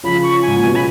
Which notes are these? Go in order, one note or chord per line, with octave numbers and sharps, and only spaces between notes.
C#3 F3 B5
C#6
G#5
G#2
A#2
B2 G#5
C#3 B5